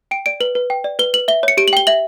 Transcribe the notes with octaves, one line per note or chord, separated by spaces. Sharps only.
G5 D7
D5 D7
B4 F#7
B4
G5
D5
B4 G7
B4 F#7
E5 G7
C#5 C#7
G4 D7
F#7
G5 G7
E5 F#7